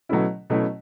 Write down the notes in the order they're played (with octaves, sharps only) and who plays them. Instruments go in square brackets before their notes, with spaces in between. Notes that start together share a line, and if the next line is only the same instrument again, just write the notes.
[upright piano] B2 F#3 A3 C#4 E4
B2 F#3 A3 C#4 E4